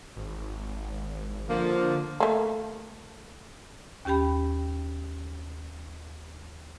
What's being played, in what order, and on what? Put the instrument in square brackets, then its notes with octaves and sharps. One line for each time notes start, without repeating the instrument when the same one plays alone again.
[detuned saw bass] G#1
[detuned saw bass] D3 [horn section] F3 [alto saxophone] A#3
[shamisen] A3 A#3
[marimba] D#2 C#4 G4 G5 B5